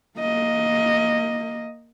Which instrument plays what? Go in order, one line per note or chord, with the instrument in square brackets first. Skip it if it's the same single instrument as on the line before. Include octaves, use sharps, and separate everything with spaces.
[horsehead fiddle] A#3 D#5